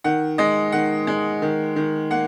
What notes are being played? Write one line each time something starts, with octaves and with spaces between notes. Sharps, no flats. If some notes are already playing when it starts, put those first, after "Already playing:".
D#3 F#5
G#3 D#5
D#3 F#5
G#3
D#3
D#3
A#3 F#5